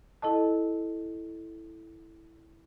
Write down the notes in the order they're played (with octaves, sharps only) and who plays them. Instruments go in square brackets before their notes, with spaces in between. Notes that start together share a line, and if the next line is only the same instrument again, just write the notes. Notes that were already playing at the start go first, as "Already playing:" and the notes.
[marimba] E4 A4 D#5 A5